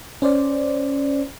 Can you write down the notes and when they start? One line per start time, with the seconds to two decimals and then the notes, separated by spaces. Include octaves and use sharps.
0.22 C#4 C5 D5